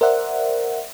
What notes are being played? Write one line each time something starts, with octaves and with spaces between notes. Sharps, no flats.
A#4 C5 D5 E5 F#5